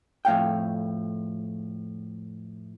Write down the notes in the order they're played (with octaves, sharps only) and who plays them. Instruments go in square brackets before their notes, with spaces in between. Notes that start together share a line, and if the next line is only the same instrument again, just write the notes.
[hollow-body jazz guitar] F2 A2 F5 G5